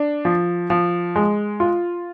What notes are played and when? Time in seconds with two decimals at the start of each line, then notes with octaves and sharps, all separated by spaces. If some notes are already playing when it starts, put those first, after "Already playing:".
Already playing: D4
0.25 F3
0.70 F3
1.16 G#3
1.60 F4